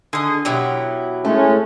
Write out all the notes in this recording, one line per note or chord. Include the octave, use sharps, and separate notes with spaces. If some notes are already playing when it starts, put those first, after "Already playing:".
D3 G#4 D#5
B2 F#3 E4 G4
A2 G#3 A3 C#4